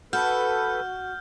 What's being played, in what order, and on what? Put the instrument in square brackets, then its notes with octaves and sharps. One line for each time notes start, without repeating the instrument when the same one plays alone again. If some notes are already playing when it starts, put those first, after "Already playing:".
[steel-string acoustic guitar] F#4 [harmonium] A4 B4 [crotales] F6 G6